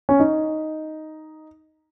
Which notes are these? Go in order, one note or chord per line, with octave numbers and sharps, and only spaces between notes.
C#4
D#4